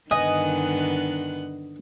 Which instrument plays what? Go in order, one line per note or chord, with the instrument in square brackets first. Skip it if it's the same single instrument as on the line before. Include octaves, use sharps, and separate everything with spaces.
[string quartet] G2 B3 F#6 [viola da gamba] D3 D#3 [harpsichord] D#5 [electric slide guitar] G#5